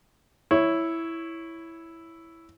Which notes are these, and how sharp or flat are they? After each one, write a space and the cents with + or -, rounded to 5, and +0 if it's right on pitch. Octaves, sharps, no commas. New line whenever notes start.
E4 +0 C#5 +0